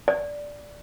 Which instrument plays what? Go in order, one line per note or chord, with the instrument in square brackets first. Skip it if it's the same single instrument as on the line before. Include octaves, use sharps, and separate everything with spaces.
[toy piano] D5